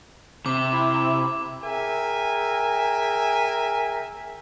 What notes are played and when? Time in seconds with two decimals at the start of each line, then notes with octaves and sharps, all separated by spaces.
0.46 C3 D6
0.73 E4
1.64 G#4 A#4 E5 G5 G#5